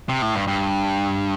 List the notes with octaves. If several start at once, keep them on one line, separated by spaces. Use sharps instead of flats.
C3
A2
G2
G2